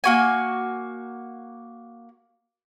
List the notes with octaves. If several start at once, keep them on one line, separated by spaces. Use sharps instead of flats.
A#3 F#4 G#5